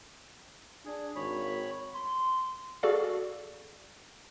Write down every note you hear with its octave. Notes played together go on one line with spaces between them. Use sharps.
D4 G#4
G#1 C#5 B5
C6
F#4 G#4 A4 D5 F5